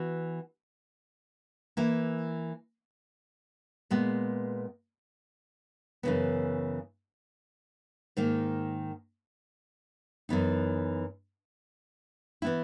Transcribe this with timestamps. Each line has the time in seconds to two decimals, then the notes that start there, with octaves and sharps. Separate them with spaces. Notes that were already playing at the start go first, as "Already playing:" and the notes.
Already playing: E3 B3 F#4
1.77 E3 A#3 E4
3.90 A#2 G#3 B3
6.03 F#2 C#3 E3 B3
8.17 G#2 D#3 A#3
10.29 F#2 E3 B3 D#4
12.42 E3 B3 E4